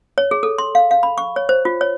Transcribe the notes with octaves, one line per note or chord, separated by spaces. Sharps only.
C#5
G#4
A4
C6
F5
F5
B5
C#6
C#5
C5
F4
C#5